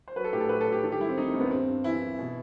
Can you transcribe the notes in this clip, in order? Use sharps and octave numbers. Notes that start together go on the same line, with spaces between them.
C5
F#3 B4
A4
A2 G4
A4
F#3 B4
A4
F#3
G4
D#3 A4
G4
G3 E4
C4
D#2 D#4
C4
D#2
B3
G2 C4
G2
E3 E4
E3
B2